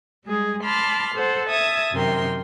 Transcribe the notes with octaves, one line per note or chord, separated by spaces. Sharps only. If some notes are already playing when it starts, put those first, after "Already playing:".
G3 G#3 G#4
A5 B5 C6 D6 F6
A4 C5 F#5
E5 A5 D#6 G#6
F#2 C3 D#3 A#4 G5 C6